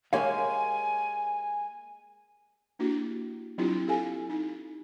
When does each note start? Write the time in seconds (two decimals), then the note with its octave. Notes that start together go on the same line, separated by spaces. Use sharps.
0.13 G#3 A#3 G4 C#5 F5 G#5
2.79 A#3 D4 E4 F#4 G4
3.58 F#3 C4 D4 E4 F4 G4
3.88 G4 A4 F5 G#5
4.30 D#4